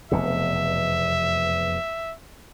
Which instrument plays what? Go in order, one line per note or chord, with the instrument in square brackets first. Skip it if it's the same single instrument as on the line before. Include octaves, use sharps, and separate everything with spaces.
[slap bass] F1 E2 B2 [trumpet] E5